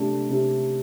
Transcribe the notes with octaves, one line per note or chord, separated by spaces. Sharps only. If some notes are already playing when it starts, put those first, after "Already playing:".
Already playing: C3 A3 D4
C3